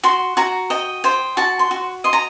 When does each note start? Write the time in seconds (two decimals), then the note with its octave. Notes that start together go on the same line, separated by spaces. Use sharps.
0.03 F#4 C6
0.37 F#4 A#5
0.70 D#5 G5
1.04 C5 G5
1.37 F#4 A5
1.59 C6
1.71 F#4
2.04 D#5 C6
2.13 A#5